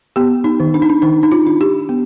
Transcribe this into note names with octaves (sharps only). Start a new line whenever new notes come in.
B3 G4
D#4
D#3
D4
D#4
D4
D#3 D#4
D#4
F4
D4
G4
B3